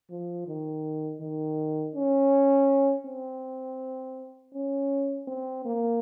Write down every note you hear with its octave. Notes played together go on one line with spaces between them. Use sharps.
F3
D#3
D#3
C#4
C4
C#4
C4
A#3